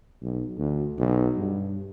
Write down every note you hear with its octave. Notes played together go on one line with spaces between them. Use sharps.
B1
D2
B1
G2